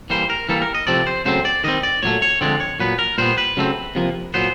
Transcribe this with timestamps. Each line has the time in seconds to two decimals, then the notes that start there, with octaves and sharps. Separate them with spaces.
0.10 E3 G3 A#3 C5
0.30 A#4
0.49 E3 G3 A#3 A4
0.62 A#4
0.75 D#5
0.87 C3 F3 A3 C4 D5
1.07 C5
1.25 C#3 F#3 A3 C4 C5
1.45 D5
1.64 D#3 G3 C4 D#5
1.83 D5
2.03 A#2 F#3 A3 C#5
2.22 C#5
2.41 D3 F3 G#3 C4 D5
2.60 C#5
2.80 A#2 F#3 B3 B4
2.99 A#4
3.18 A#2 G3 B3 C5
3.38 B4
3.57 C#3 F#3 A3 C4
3.95 C3 F3 A#3
4.34 A#2 F#3 B3 C5